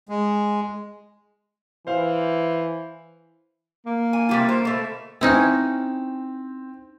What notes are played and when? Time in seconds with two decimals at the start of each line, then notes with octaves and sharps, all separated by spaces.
0.09 G#3
1.87 E3 C5 F5
3.86 A#3
4.13 G#5
4.29 C3 G3 F4
4.49 C5
4.65 B2 A3
5.21 C4 C#4 D#4 E4